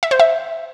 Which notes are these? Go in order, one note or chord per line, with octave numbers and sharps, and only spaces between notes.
E5
C5
E5